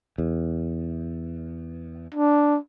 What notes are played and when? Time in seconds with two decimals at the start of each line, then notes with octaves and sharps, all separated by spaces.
0.18 E2
2.14 D4